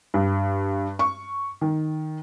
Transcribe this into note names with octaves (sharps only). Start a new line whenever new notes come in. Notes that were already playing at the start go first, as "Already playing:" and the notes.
G2
C#6
D#3